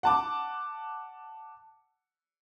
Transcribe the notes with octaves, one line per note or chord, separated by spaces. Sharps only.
F#5 A5 D6